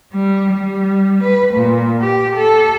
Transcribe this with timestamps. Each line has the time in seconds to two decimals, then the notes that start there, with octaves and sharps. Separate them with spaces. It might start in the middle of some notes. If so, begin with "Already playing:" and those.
0.13 G3
0.53 G3
1.23 B4
1.54 A#2
2.01 G4
2.36 A4